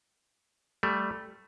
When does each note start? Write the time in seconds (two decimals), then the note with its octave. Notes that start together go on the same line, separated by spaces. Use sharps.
0.83 G3 A3